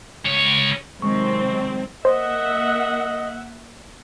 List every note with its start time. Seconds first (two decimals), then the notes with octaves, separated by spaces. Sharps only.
0.25 C#2 C#5
1.02 C3 D#3 F#3 G#3 C4 C#6
2.05 A#3 C5 D#5 E5 F#5